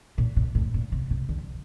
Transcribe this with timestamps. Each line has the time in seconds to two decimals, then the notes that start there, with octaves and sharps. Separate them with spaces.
0.18 A#2
0.36 A#2
0.55 A2
0.74 A#2
0.92 C3
1.11 C3
1.29 D3